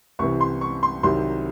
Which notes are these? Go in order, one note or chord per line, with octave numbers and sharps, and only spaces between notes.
C2 C3 E3 C#6
C6
C#6
C6
C2 C3 D#3 F#3 C6